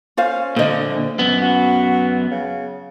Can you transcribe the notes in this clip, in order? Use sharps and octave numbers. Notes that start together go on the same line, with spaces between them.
C#4 F4 C5 F5
D2 A#2 D3 C5 D#5
F#2 B3
F#4
C#3